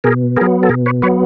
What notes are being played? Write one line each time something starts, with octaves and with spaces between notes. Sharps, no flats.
B2 G#4 A#4
F#3 B3 G#4 A#4
A4
B2 G#4 A#4
B4 C#5
F#3 B3 B4 C#5